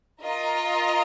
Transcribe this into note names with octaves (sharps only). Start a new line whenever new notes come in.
F4 A#4 D#5